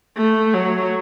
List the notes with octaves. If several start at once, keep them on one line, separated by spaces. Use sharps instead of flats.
A3
F#3